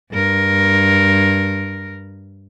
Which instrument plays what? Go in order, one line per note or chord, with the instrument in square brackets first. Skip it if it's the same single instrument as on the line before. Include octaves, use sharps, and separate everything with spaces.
[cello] G2 A#4